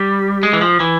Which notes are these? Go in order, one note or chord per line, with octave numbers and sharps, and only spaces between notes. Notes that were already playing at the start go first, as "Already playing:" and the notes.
Already playing: G3
G#3
E3
F3
E3